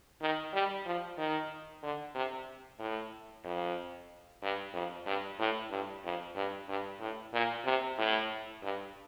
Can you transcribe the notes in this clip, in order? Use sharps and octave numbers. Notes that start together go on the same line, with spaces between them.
D#3
G3
F3
D#3
D3
C3
A2
F2
G2
F2
G2
A2
G2
F2
G2
G2
A2
A#2
C3
A2
G2